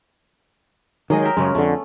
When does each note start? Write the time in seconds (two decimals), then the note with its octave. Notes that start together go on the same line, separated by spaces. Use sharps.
1.10 D#3 F#3 G#3 G#4 D#5
1.23 A#4 E5 G5
1.37 F#2 C#3 G#3 C#4
1.55 F2 D3 A3 B3